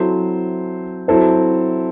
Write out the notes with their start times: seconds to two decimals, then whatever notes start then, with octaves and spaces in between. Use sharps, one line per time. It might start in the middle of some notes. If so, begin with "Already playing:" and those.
Already playing: F#3 C4 E4 A4 C5
1.08 F#3 C4 E4 A4 C5